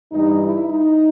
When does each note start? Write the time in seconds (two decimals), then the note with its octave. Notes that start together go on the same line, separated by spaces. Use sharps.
0.12 G2 E3 G3 D#4
0.41 E4
0.69 D#4